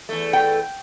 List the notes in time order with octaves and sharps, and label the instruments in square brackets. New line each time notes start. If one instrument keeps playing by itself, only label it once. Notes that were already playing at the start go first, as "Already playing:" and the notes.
[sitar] E2 A3
[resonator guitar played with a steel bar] G5